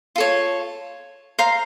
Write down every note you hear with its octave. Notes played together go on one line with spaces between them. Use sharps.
F4 A4 C#5
C5 F5 A#5